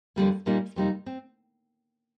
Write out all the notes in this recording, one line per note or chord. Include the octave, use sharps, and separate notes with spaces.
F2 D3 G3 A#3
A#2 G3 A#3 D#4
F2 C3 G3 A#3 D#4
C4